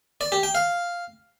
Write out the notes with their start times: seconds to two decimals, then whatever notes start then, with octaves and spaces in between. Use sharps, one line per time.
0.21 D5
0.32 G4
0.43 G5
0.55 F5